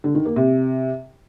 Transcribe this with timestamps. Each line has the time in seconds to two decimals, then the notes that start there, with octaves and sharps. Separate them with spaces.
0.04 D3
0.15 D#3
0.25 A#3
0.36 C3